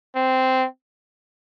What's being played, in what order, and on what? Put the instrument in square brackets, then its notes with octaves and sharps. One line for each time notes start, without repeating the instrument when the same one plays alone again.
[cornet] C4